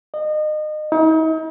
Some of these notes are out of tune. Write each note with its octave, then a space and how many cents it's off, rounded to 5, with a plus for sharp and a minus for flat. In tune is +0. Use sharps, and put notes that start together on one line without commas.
D#5 -30
D#4 +40